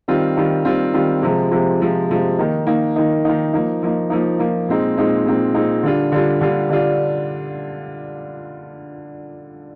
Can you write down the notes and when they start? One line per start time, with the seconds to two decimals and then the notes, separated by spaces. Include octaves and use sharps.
0.08 D#3 G3 C4 F4
0.37 D#3 G3 C4 F4
0.65 D#3 G3 C4 F4
0.94 D#3 G3 C4 F4
1.22 C3 F3 G#3
1.51 C3 F3 G#3
1.80 C3 F3 G#3
2.09 C3 F3 G#3
2.38 D#3 A#3 D#4
2.67 D#3 A#3 D#4
2.96 D#3 A#3 D#4
3.25 D#3 A#3 D#4
3.54 F3 A#3 D#4
3.82 F3 A#3 D#4
4.10 F3 A#3 D#4
4.39 F3 A#3 D#4
4.68 A#2 G#3 C4 D#4
4.97 A#2 G#3 C4 D#4
5.26 A#2 G#3 C4 D#4
5.54 A#2 G#3 C4 D#4
5.83 D3 G3 D4 F4
6.12 D3 G3 D4 F4
6.41 D3 G3 D4 F4
6.70 D3 G3 D4 F4